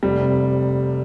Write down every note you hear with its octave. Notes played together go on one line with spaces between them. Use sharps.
F1 G3
C3